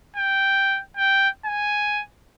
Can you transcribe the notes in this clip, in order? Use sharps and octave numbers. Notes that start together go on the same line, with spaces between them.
G5
G5
G#5